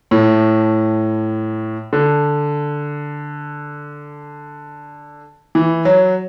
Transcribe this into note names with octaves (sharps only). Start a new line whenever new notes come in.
A2
D3
E3
F#3